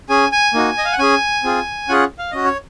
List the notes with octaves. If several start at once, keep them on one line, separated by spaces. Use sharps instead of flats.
C#4 G#4 G#5
G#5
A#3 D#4 F#4
D#5
F5
F#5
C#4 G#4 G#5
C4 F4 G#4
C#4 F4 G#4 F#5
F5
C#4 F#4 D#5
C#5